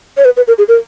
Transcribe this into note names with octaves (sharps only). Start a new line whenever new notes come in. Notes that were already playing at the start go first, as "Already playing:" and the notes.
C#5
B4
B4
A#4
G#4
A#4